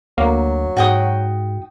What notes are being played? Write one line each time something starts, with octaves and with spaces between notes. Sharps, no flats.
D2 F#3 A#3
G#2 F#4 G5 D#6